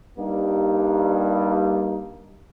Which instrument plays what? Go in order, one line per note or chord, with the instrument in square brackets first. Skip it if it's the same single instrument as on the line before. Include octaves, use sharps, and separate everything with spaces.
[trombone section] G2 G3 A#3 D#4